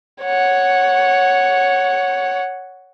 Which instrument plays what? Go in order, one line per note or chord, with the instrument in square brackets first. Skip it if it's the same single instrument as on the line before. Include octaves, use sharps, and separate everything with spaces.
[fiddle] C#5 F#5